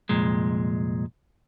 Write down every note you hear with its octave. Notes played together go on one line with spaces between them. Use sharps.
C2 F2 A#2 G#3